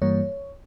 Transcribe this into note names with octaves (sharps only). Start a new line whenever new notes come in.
G2 E3 G3 A#3 C#5